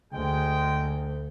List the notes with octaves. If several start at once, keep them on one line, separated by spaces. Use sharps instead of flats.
D2 G#3 G5